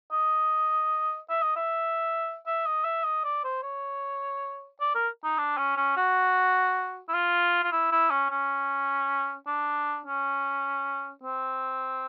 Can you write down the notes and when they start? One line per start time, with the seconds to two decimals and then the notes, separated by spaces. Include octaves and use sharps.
0.12 D#5
1.29 E5
1.42 D#5
1.56 E5
2.46 E5
2.66 D#5
2.84 E5
3.04 D#5
3.24 D5
3.44 C5
3.63 C#5
4.80 D5
4.95 A#4
5.24 D#4
5.38 D4
5.58 C#4
5.77 C#4
5.97 F#4
7.09 E4
7.14 F4
7.63 F4
7.72 E4
7.92 E4
8.11 C#4
8.31 C#4
9.47 D4
10.06 C#4
11.23 C4